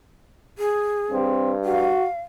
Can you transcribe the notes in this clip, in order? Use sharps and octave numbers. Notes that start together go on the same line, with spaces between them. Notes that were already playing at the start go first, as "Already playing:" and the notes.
G#4
G2 C4
F#4 F5